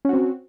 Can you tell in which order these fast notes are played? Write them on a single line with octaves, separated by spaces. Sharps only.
C#4 F#4 C4